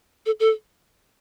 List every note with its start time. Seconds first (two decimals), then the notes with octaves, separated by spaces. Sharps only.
0.26 A4
0.40 A4